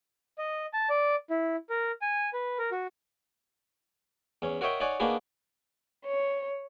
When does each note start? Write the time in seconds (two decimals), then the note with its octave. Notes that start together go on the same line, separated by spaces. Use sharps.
0.38 D#5
0.73 A5
0.90 D5
1.30 E4
1.70 A#4
2.02 G#5
2.33 B4
2.59 A#4
2.72 F#4
4.42 E2 C#4
4.61 F#4 A#4 C#5 D#5 E5 G5
4.80 D#4 C#5 D5 F#5 G#5
5.00 A#3 D4 D#4 F#4 G#4 B4
6.06 C#5